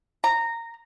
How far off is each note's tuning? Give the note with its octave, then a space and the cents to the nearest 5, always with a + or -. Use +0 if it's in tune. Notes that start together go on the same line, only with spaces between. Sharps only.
A#5 -15